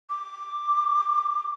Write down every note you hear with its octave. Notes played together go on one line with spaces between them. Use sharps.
D6